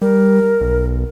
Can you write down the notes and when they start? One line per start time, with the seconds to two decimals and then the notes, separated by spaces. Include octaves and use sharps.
0.02 G3 A#4
0.61 B1